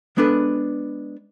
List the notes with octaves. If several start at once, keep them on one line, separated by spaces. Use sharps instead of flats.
G#3 B3 D4 A4 B4